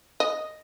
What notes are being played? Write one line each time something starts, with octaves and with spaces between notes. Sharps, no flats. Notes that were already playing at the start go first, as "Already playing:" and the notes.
D#5